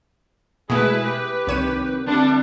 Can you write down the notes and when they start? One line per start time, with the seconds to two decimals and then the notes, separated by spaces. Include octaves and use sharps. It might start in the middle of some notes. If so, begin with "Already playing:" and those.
0.70 B2 G#3 A3 E4 G#4 B4
1.03 G4 B4
1.47 C2 C3 D#3 C#5 D#7
2.07 D2 G3 C4 D4 B5